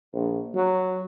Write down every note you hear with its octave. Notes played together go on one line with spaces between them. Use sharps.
A#1
F#3